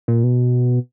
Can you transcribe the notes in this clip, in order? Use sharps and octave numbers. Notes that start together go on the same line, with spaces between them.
A#2
B2